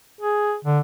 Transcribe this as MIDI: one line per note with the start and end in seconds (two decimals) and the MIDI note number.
0.21 0.55 68
0.65 0.80 50